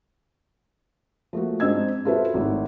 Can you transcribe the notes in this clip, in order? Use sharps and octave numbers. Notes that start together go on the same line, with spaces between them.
F3 A3 A#3 F#4
G#2 C4 D4 D#5 E6 G#6
F4 F#4 A4 B4 C5 E5
G#1 A2 D#4